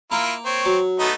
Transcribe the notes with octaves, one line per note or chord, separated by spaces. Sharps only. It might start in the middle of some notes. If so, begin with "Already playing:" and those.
A#3 E4 F4 A#4
C4 C#5
F#3
A3 B3 D#4